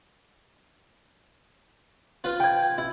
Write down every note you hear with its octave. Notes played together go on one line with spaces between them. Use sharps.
F4 B4
G5 G#6
E4